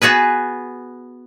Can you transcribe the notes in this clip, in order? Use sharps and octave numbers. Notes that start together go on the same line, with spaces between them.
B3 F#4 G#4 B4